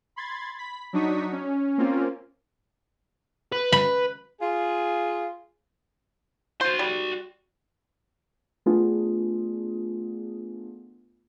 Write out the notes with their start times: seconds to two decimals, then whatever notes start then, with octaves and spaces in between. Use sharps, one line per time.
0.16 B5 C6 G#6 A6
0.59 B5 B6
0.93 F#3 D4 D#4 C#6 D#6 B6
1.32 C#4
1.78 A#3 C4 C#4 F4
3.52 B4
3.72 B5
4.40 F4 G#4
6.61 F#4 C5 C6
6.79 G3
8.66 A3 B3 D4 F4 G#4